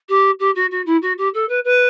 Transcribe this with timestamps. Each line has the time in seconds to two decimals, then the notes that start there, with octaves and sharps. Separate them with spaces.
0.09 G4
0.40 G4
0.55 F#4
0.71 F#4
0.86 E4
1.02 F#4
1.18 G4
1.34 A4
1.49 B4
1.64 B4